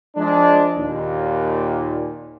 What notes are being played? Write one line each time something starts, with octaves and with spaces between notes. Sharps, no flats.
F3 G#3 D4
D#2 A#2